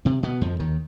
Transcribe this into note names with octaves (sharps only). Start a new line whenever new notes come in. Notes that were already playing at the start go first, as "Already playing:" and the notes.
C3 C4
B2 B3
F2 F3
D#2 D#3